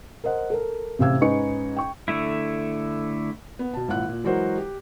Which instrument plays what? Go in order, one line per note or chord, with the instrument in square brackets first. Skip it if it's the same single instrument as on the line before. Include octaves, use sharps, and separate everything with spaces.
[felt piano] A#4 C5 D#5 F#5
A4 A#4
A1 C3 F5 E6 G#6
G#2 C#4 D#4 B4 C#6 C#7
G5 C#6
[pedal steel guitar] D3 A3 E4
[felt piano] B3
B2 A5
G#1 A#2 E4 F#5 F#6
A#2
E3 F#3 G#3 F#4 A#4 C5
G4